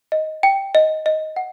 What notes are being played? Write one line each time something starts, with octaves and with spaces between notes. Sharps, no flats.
D#5
G5
D#5
D#5
F#5